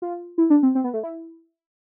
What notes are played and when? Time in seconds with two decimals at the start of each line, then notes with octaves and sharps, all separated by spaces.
0.02 F4
0.38 E4
0.50 D4
0.63 C4
0.75 C4
0.84 B3
0.94 A3
1.03 E4